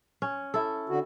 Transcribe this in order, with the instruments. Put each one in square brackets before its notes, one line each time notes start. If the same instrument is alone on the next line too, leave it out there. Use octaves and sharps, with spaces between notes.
[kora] C#4
E4 A4
[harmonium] D3 F#4